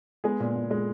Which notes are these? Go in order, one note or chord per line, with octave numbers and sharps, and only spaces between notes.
G#3 B3 G#4
A#2
A#2
G#3